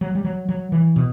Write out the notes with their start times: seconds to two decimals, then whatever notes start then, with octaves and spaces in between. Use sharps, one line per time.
0.01 F#3
0.15 G3
0.25 F#3
0.49 F#3
0.72 E3
0.96 B2